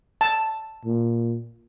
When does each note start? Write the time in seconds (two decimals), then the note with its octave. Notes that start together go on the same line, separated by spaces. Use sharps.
0.21 A5
0.85 A#2